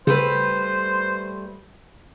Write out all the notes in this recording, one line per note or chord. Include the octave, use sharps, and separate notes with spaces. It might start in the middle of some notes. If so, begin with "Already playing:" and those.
C#3 G3 A3 B4 C5